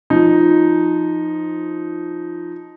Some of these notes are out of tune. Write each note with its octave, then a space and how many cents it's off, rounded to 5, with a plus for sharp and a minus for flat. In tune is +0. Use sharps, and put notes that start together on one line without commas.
F3 +0 D#4 +0